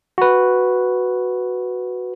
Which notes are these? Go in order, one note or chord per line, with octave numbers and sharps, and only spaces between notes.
F#4 B4